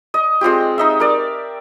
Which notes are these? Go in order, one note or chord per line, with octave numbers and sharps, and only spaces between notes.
D#5
G#3 C4 F4 G4
D#4 D#5 E5
A#4 D5